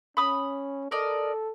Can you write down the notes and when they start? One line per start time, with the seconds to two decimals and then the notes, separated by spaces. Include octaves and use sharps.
0.17 C#4 B5 D#6
0.91 A4 A#4 D5 D#5